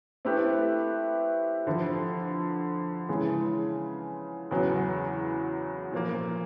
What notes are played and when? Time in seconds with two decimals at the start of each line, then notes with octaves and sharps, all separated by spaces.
0.25 A3 C4 E4 G4 B4
1.66 F2 D3 F3
3.09 C#3 E3 G#3
4.51 E2 C#3 F#3 B3
5.92 A#2 F3 A#3